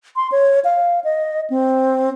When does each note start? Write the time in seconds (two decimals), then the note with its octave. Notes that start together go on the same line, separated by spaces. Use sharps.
0.16 C6
0.32 C#5
0.65 F5
1.04 D#5
1.50 C4